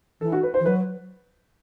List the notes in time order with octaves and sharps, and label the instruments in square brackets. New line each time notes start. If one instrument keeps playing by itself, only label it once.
[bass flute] E3 [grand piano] A4
[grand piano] F#4
B4
C5
[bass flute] E3
[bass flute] F#3 [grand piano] B4